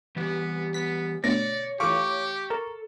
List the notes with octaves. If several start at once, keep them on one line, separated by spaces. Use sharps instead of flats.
E3 G3 B3 G4
B3 B6
B2 D3 A3 C#5 D5 A#6
E3 A3 F4 G4 C#6 D6
A4 A#4